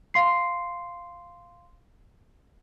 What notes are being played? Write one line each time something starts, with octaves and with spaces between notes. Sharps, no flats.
F5 C6 C7